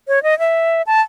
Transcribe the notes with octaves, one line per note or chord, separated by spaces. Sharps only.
C#5
D#5
E5
A5